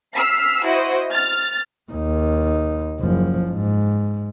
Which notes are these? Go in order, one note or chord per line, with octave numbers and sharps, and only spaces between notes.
E6 F6 B6 C7
E4 F#4 C5 D#5
F6 A6
D#2 D#4
F#1 F3
G#2